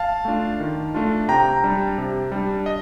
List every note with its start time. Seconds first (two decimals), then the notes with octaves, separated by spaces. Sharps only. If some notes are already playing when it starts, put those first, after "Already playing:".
Already playing: F5 A5
0.25 A3 D4 F4
0.60 D#3
0.94 A3 D4 F4
1.28 C3 G5 A#5
1.64 G3 D4
1.98 C3
2.32 G3 D4
2.66 D#5